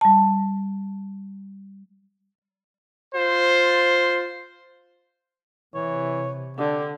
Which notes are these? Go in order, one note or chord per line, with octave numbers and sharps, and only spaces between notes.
G3 A5
F4 C5
C3 E3 C#5
D3 D4 G4